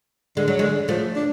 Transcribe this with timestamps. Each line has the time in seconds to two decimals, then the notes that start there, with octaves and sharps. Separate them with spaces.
0.37 D3 G#3
0.48 F#3
0.59 D3 G#3
0.89 F3 A3
1.16 D4